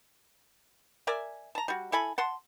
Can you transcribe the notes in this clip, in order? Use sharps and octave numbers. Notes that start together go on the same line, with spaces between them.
A#4 D5 E5 G#5
A5 A#5
G3 F#4
E4 A4 G#5 B5
F#5 A5 C6